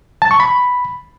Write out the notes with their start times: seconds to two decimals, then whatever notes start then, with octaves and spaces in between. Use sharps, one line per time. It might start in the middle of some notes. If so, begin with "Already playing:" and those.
0.22 A5
0.31 C#6
0.40 B5